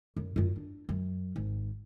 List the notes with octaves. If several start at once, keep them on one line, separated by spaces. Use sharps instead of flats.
F#2
F#2 F4
D4
F#2
G#1